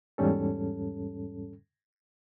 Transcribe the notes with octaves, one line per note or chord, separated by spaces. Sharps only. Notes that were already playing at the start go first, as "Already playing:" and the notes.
E2 G#2 G3 C#4 A4